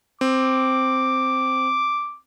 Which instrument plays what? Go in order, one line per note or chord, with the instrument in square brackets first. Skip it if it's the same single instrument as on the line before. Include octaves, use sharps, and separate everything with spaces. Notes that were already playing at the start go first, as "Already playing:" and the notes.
[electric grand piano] C4 [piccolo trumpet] D6